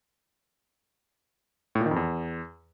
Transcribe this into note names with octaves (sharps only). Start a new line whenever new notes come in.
A2
A#2
D#3
F2
E2